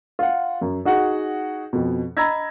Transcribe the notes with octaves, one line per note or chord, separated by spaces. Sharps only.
F4 F#5
F#2
D#4 F#4 G#4 F#5
F2 B2
D#5 A#5 B5 E6 G#6 A#6